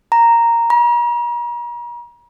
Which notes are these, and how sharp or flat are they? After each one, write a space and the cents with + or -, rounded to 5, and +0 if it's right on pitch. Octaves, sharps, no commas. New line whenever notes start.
A#5 -5
A#5 +40